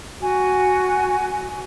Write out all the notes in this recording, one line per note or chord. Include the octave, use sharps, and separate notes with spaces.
F#4 G#5